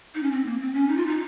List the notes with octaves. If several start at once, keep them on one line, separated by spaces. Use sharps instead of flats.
D#4
C#4
C4
A#3
C4
C#4
D#4
F4
D#4